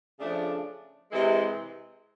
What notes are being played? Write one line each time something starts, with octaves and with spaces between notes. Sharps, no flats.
C#3 F3 A3 D4
C3 E3 G#3